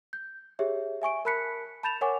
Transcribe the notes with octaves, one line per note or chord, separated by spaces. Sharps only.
G6
G4 G#4 C#5 E5
E5 G#5 C#6 D7
A#4 A5 B5 F#6 B6 C#7
A5 B5 G6 A6 E7 F7
A#4 C#5 F#5 G#5 C#6 D6